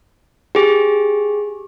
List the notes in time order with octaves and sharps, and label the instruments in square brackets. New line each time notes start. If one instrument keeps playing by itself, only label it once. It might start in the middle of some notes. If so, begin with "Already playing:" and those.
[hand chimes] G4 G#4